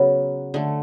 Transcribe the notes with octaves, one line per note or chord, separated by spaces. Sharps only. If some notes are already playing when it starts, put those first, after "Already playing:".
Already playing: C#3 F#3 B3
D3 A3